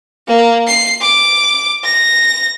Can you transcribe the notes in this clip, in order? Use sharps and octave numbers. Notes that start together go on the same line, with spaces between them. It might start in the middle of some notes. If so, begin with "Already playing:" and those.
A#3
C7
D6
A#6